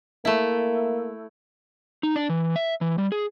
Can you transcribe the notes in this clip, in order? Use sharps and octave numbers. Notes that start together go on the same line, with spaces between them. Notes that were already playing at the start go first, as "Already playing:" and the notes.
A3 A#3 E4
D#4
D4
E3
E5
E3
G3
G#4